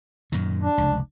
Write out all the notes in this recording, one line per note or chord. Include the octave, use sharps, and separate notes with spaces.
F#2 A#2 D#3
D4
F1 C#2